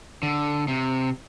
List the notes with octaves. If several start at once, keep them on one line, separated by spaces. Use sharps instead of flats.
D3
C3